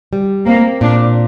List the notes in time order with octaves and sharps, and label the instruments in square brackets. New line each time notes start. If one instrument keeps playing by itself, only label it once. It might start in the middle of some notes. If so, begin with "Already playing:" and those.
[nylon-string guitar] G3
[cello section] A#3 [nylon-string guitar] C4
[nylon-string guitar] A#2 [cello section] D4